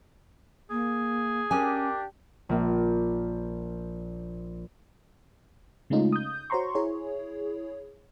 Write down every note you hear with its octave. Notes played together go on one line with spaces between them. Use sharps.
A#3 G#4
C#4 D4 G4 A#4 G#5
A#1 A#3
C#3 G#3 A3 C#4 D#4 F4
D#6 G6
F#4 C5 C#5 A#5 C6 C#6
E4 G#4 C#5